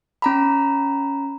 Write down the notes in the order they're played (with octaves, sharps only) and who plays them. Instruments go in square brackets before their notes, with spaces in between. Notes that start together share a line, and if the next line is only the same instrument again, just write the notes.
[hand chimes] C#4 A#5 B5